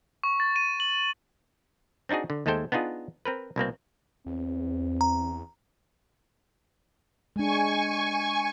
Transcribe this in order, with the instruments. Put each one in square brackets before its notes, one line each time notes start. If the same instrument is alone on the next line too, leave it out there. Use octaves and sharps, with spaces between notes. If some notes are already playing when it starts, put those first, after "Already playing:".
[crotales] C#6
A6
D#7
F#7
[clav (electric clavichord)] C4 D4 D#4 F#4 G#4
D3
D#2 G#3 A3 A4 C5 G5
B3 D4 D#4 F4 G#4
C4 A#4 B4
C2 B2 A#3 C4
[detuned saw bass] E2 [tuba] C4
[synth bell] A#5
[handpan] G#3 D4 [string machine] G#5 C#6